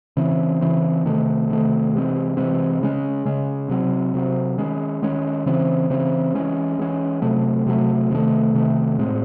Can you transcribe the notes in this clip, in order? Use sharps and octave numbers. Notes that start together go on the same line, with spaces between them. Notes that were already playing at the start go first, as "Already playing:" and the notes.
C#3 E3 C4
C#3 E3 C4
C3 D#3 A3
C3 D#3 A3
C3 E3 G#3 C4
C3 E3 G#3 C4
C#3 G#3 C#4
C#3 G#3 C#4
C3 F#3 C4
C3 F#3 C4
D#3 G#3 C#4
D#3 G#3 C#4
C#3 E3 C4
C#3 E3 C4
E3 G#3 C#4
E3 G#3 C#4
C3 F#3 A3
C3 F#3 A3
C3 D#3 A3
C3 D#3 A3
A2 G#3 C4